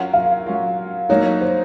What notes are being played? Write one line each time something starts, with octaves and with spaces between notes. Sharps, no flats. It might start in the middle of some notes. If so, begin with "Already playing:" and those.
Already playing: F#3 C#4 F4 A#4 F#5
F5
F#3 C#4 F4 A#4
F#3 A#3 D#4 F#4 C#5
C5